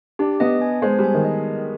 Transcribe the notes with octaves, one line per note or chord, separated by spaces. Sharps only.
D4 G4
B3 D#5
G#5
G#3 C5
G3 G#5
D#3
D#5